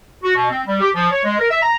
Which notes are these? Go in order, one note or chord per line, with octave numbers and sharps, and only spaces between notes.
F#4
B2
C4
G3
G4
F3
C#5
G#3
A#4
E5
A#5